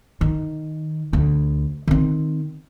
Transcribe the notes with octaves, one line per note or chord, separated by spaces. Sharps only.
D#3
D2
D#3 C4